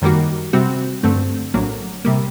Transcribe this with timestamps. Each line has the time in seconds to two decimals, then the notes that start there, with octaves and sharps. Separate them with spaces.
0.02 F#2 D#3 G3 A#3 F#4
0.53 C3 G3 C4 F#4
1.03 G2 D3 A3 C4
1.54 A#1 A2 F#3 A#3
2.05 C3 G3 A#3